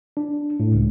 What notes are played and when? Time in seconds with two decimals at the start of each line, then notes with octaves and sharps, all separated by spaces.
0.17 D4
0.60 A2
0.74 C#2